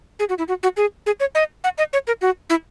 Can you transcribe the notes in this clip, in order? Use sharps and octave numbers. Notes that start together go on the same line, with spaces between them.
G#4
F#4
E4
F#4
F#4
G#4
G#4
C#5
D#5
F#5
D#5
C#5
A#4
F#4
E4